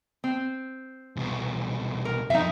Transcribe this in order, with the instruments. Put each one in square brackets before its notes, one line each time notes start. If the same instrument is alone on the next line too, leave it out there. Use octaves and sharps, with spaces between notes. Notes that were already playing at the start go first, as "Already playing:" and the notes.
[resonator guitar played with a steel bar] C4
[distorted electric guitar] C2 B2
[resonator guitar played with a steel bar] A#4
[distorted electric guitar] F#2 F3 [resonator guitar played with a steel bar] D#4 E5